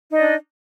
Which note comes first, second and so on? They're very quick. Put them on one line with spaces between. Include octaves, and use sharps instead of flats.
D#4 D#5 D5 D4